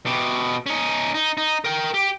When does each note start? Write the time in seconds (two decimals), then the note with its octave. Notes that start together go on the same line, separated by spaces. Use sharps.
0.06 B2 G4
0.66 C#4 D#4
1.14 D#4
1.37 D#4
1.65 A#4 G5
1.94 G4